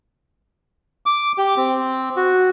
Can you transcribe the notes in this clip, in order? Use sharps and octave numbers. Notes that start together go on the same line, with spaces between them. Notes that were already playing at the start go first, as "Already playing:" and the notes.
D6
G4
C4
F#4